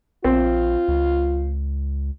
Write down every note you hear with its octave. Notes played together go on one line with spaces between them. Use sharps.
A#1 C4 F4
C#2